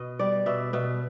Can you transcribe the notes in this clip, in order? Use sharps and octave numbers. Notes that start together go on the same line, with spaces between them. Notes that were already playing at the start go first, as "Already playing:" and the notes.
Already playing: B2 D#5
G3 D5
B2 E5
B2 E5